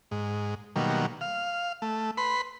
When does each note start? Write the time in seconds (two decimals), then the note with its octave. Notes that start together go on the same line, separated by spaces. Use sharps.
0.11 G#2
0.76 B2 D#3 F#3 G3 A#3
1.21 F5
1.82 A3
2.17 B4 B5 C6